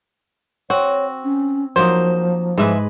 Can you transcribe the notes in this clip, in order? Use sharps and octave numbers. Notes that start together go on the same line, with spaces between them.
C4 F#4 C#5
C#4
F3 F#3 A#3 D#4 C5
G#2 E3 G#3 B4 E5